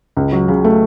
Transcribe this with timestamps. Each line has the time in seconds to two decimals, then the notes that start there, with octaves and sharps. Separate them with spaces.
0.17 C#2
0.32 F#3
0.48 C#3
0.64 A3